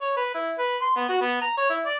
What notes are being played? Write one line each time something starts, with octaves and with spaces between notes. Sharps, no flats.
C#5
B4
E4
B4
C6
B3
F#4
B3
A#5
C#5
E4
D5